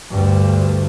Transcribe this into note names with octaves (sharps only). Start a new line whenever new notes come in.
D2 G2